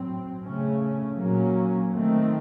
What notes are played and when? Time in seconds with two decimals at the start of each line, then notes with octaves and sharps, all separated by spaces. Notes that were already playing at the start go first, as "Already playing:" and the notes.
Already playing: A2 F#3 C4
0.44 C#3 A3 C#4
1.17 A#2 F#3 A#3 C#4
1.91 D#3 A3 C4